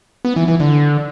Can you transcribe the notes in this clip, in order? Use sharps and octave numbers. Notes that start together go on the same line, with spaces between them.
B3
E3
E3
D3